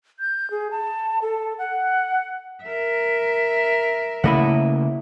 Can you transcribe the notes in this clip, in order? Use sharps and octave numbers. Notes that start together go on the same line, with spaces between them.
G6
G#4
A5
A4
F#5
A#4 E5
C#3 A3 A#3 E4 D#5 F#5